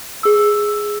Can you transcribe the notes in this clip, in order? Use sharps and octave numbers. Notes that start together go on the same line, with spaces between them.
G#4 E6